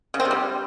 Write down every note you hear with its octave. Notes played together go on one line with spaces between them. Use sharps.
C#3
C4
C3
G3